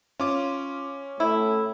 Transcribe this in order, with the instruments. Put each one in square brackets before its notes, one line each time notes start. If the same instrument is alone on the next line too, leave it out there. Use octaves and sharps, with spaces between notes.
[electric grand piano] C#4 D6 [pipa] F4
[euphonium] A2 [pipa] E4